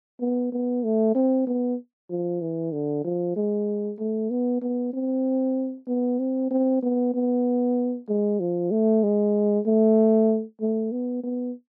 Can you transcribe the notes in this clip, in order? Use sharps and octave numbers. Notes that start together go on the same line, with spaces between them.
B3
B3
A3
C4
B3
F3
E3
D3
F3
G#3
A3
B3
B3
C4
B3
C4
C4
B3
B3
G#3
F3
A3
G#3
A3
A3
B3
B3